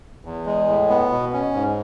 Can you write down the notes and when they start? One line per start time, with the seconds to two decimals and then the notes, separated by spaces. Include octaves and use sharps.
0.25 E2
0.46 G#3
0.68 A2
0.89 B3
1.11 B2
1.33 C#4
1.54 G#2